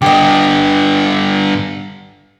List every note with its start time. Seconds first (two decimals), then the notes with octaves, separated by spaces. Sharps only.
0.02 G2 D3 G4 D#5